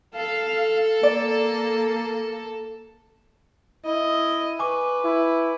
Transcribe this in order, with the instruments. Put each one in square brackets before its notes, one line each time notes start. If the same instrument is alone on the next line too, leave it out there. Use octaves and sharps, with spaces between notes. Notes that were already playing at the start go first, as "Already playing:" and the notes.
[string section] A4 [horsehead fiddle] F5
[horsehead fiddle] A#3 [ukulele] D5
[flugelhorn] E4 [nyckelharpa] D#5
[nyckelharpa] B4 [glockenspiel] G#5 C#6 D6
[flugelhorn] E4